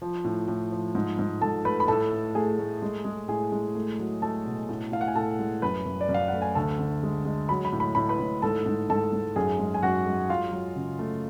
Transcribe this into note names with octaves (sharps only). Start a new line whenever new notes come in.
F3
A2
A2
F3
G#2
G#2
G#2 A4 A5
A3 B4 B5
B5
A2 A4 A5
A3
A3 G#4 G#5
A3
G#3
G#3
A2 G#4 G#5
G#3
A3
F#3
A3 A4 A5
B2
A2
A2 F5
F#5
G#5
A2 A4 A5
G#3
F#2 B4 B5
F#2
D5
F#2
F5
A3 F#5
G#5
D2 A4 A5
D3
G#3
G#3
F#3 B5
B5
A2
B5
A2 B5
B4 B5
A2
G#2 A4 A5
G#2
G#2 A4 A5
G#2
F#2 G#4 G#5
G#3
G#5
F#2 F#4 F#5
G#3
F#3 F4 F5
F#3
C#3
A3